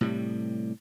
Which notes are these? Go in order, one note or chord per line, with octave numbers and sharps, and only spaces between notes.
A2 C3 G3